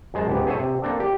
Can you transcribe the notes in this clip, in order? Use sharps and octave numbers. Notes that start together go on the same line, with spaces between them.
F#2 G#3 C5 A5
C#2 G#2 B3 G4
G#4 A4 C5 C#5 E5 G#5
C3
A#3 C4 D4 A4
G4